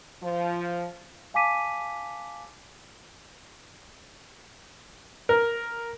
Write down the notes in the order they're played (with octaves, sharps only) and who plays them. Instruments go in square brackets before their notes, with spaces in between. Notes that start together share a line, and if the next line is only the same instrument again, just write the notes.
[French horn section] F3
[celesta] F5 G#5 A5 D6 B6 D#7
[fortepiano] A#4